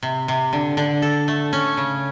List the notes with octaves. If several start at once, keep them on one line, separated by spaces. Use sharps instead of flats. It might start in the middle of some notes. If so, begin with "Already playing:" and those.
C3
C3
D3
D3
A4
A3
C#4
C#3